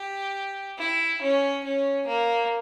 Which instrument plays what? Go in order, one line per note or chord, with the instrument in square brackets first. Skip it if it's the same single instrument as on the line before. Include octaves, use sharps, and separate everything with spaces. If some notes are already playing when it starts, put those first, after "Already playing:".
Already playing: [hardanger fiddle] G4
E4
C#4
C#4
A#3